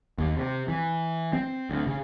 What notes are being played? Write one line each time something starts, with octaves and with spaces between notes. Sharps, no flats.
D#2
C3
E3
C4
D2
C#3